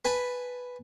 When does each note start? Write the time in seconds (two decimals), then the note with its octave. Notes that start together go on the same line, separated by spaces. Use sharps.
0.05 B4 G#5 A5 B5